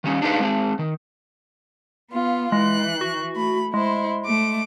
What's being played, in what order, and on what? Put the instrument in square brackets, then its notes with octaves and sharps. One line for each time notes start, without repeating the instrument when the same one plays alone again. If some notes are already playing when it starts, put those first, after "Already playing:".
[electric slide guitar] D#3 G3 C#4
D4 D#4 G#4 B4 F5
G#3 C4 G#4
D#3
[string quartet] B3 F4 F5
[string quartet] E3 F#6 [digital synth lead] G#3
[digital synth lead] F#4
[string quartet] A3 B5
[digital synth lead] G#3 [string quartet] E4 C5
[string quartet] A3 D6